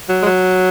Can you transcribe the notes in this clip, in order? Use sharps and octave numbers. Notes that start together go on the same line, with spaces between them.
F#3
G#3
F#3